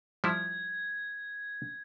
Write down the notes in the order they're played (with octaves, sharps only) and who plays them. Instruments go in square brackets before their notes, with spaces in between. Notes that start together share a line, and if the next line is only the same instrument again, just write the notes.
[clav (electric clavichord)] F3 G3 E4 [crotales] G#6